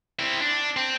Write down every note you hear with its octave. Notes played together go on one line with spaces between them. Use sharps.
C4 E4
D4
C4